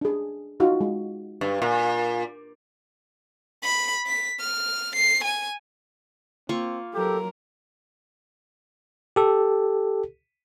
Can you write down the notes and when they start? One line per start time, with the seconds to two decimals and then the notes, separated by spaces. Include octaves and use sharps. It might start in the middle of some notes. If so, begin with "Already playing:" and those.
0.01 D4 G#4
0.60 D#4 F4 F#4
0.81 G#3
1.41 G2
1.62 A#2
3.63 B5
4.06 B6
4.40 F6
4.96 C7
5.24 G#5
6.49 A#3 C4 F4 C#6
6.94 F#3 G4 A4 A#4
9.16 G4 A4